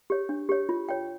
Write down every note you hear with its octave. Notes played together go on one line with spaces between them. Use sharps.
G4 C#5
D4
G4 C#5
F4
C#5 G5